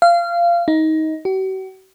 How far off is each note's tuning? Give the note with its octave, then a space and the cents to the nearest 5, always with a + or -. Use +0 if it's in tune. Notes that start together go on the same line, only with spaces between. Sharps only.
F5 -20
D#4 +20
F#4 +45